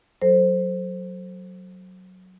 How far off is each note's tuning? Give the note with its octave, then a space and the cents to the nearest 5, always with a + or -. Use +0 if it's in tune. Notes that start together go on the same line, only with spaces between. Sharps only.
F#3 +0 A4 -5 C5 +0